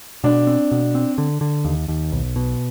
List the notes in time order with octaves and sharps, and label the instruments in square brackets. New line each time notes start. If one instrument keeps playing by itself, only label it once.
[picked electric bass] B2 [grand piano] D4
[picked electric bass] C4
B2
C4
D3
D3
D#2
D#2
B1
B2